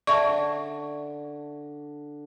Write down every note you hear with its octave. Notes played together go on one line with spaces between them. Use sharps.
D3 D4 D5 E5 A5 C#6